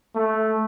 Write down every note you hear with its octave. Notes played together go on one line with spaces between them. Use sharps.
A3